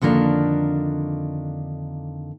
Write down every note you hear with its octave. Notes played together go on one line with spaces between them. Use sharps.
F2 D3 D#3 A#3 D4